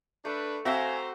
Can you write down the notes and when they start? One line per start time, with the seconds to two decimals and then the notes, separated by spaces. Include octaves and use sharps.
0.25 A3 D4 B4
0.65 C4 F#4 C5 E5 F5 G#5 A#5